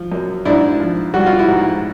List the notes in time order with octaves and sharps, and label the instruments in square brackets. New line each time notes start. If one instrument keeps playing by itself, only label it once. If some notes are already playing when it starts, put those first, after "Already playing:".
Already playing: [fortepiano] F3
F#2
G#2 D4 E4
F3
G3 F#4
F4
E4 F#4
G#2